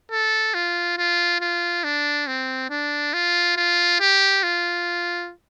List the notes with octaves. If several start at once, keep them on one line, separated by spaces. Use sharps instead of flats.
A4
F4
F4
F4
D4
C4
D4
F4
F4
G4
F4